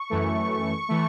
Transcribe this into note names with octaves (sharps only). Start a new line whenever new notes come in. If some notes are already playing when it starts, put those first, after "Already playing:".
Already playing: C#6
F#2 E3 A3
E3 A3